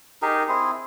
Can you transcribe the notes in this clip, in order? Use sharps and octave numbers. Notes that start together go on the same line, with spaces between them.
D#4 G4 G#4 A#4
C4 E4 G#4